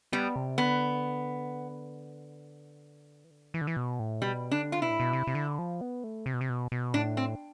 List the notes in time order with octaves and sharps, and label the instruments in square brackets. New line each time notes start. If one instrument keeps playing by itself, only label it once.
[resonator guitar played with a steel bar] G3 [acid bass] B3
[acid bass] C3
[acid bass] D3 [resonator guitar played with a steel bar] B3
[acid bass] E3
D3
E3
D3
E3
B2
A2
[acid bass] B2 [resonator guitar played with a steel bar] G3
[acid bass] D3 [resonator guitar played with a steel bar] D4
[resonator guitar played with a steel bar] F4
[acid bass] B2 [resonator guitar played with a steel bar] E4
[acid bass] A2
B2
C3
C3
D3
F3
B3
A3
C3
B2
C3
B2
B2
[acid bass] A2 [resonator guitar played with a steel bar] D4
[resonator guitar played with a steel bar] C4